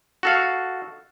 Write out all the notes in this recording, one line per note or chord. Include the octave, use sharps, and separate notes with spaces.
F#4 A4 F5